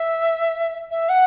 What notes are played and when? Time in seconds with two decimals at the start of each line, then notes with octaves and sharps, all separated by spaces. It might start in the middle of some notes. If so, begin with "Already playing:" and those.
Already playing: E5
0.91 E5
1.09 F#5